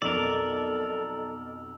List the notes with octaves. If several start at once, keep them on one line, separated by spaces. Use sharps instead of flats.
B1 F2 A4 A#4 D5 E6